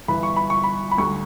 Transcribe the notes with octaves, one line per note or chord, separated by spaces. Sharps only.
G1 G2 E3 B5
C#6
B5
C#6
B5
B5
D2 D3 G3 C#6